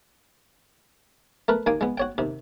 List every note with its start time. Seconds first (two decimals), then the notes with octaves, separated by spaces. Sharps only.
1.48 A3 A#4 B4
1.66 D#2 A#3 G#5 D6
1.81 G#3 B3
1.98 F#4 C#5 G5
2.18 D#2 C3